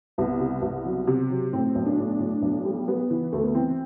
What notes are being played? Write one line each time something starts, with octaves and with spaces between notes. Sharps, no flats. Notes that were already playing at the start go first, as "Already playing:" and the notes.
C2 B3
C3
C2
F#3
C3
F#3
A2 C4
B1
D4
A2
A2
B1
G3
G3 B3
E3
D2 A3
B3
E3 C4